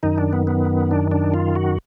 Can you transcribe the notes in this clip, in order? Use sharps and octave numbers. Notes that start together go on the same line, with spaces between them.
F#2 D#3 D#4
D4
B3
B3
D4
D4
F4
F#4